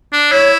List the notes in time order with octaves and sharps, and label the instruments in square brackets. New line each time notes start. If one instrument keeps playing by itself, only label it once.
[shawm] D4
[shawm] E4 [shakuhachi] C#5